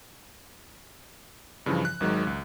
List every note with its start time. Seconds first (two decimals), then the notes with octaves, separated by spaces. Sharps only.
1.66 G2 C#3 E3 F3
1.85 F#6
2.00 G#1 D#3 F#3 G#3
2.27 C#2